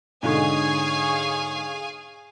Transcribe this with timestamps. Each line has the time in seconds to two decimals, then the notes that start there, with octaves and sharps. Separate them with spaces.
0.23 G#2 B2 D3 G#4 C#5 F5 G#5